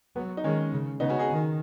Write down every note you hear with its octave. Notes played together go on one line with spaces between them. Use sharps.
F#3 B3
D#4
D#3 G#3 C#4
C#3
C#3 B3 D#4
C#4 F#4
D#4 G#4
D#3